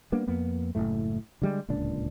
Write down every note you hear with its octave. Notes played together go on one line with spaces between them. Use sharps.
G3 A#3 B3 D4
F2 A#3 B3
F#1 C2 A2 A3
D3 G3 G#3
D1 C#2 A#2 D4